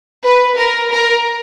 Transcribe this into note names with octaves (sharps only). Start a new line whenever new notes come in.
B4
A#4
A#4